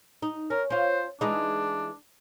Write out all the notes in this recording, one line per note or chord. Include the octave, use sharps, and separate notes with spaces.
D#4
C#4 A#4
C#4 F4 C5
E3 G#3 D4 D#4